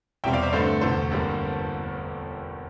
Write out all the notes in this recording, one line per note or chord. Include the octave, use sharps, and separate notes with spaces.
E1 E2 C3 G3 C4 E5 G5
D5 F5
C5 E5
G2 D3 A3 C4 A4 C5
E1 D2 C3 E3 A4 C5
G1 F2 D3 G3 A#3